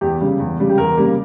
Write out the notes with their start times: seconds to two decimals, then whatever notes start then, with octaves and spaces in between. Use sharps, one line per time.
0.01 E2 G4
0.21 C#3 G3
0.40 E2
0.59 C#3 G3
0.69 G4
0.78 E2 A#4
0.97 C#3 G3 A#3